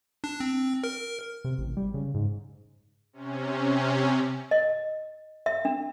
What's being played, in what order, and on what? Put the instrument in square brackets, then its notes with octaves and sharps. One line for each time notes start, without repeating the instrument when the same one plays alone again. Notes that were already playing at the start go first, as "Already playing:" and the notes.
[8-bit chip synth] D4
C4
A#4
[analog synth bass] C3
A1
G3
C#3
G#2
[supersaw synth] C3 C#4
[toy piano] D#5
E5
D4